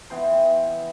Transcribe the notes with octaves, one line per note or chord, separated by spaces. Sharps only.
E3 B3 G5 C6